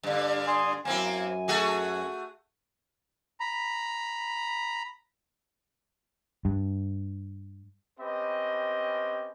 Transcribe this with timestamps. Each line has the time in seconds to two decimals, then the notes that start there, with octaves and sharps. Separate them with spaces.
0.03 G2 D3
0.48 G#5 C6 D#6
0.85 F#2 A#3 C4 E4 G#5
1.48 A3 F#4 G#4
3.40 A#5 B5
6.45 G2
7.99 C4 C#4 G4 B4 D#5